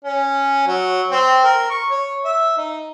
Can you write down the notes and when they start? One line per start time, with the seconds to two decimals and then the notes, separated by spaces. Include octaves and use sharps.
0.05 C#4
0.67 F#3
1.11 C4
1.45 A#4
1.70 C#6
1.91 C#5
2.25 E5
2.58 D#4